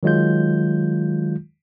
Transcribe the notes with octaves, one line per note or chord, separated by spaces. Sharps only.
D#3 F#3 G#3 F4 G6